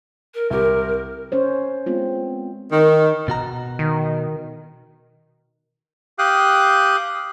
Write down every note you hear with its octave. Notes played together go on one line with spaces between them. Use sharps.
A#4
C2 G4 A#4
C#4 C5 C#5
G#3 B3 C4 F4
D#3
B2 F#4 A#5
D#3
G4 F5 G5 D#6 F#6